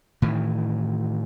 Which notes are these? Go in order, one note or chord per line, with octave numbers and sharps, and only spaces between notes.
A2 D#3 E3